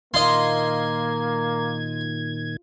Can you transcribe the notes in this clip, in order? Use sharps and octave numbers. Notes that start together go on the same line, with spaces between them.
A#2 D#3 A#3 F4 D#5 C6 G#6